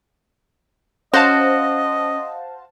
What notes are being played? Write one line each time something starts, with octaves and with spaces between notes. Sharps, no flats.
C#4 F#4 C5 D#5 F5 A5